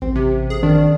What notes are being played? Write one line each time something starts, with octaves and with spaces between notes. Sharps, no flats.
A1 C4
C3
G#4
D#3 D4